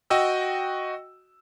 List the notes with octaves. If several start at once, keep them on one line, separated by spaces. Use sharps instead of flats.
F#4 D#5 G5 E6